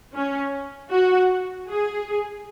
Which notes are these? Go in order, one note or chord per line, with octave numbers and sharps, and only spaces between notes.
C#4
F#4
G#4